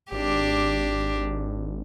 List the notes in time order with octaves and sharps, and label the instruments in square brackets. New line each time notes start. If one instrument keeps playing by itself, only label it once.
[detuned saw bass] G#1 [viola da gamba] D4 G4